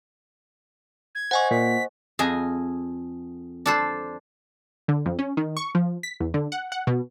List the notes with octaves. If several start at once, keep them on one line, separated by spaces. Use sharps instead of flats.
G#6
C5 D#5 F#5 G#5 C#6
A#2 B6
F2 G#4 D#5 G#5
D4 A4 C5
D3
F2
C#4
D#3
C#6
F3
B6
E2
D3
F#5
F#5
B2